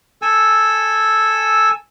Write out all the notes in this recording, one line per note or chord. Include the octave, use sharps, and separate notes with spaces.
A4 G#5 E6